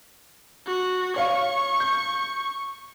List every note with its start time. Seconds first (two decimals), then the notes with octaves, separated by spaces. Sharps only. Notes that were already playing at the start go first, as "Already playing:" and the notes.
0.66 F#4
1.16 C#5 F5 C#6
1.80 G6